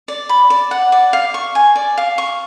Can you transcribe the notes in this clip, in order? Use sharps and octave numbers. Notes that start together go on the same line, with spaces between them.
D5
B5
D5
F#5
D5
F5
C#6
G#5
D5
F5
C#6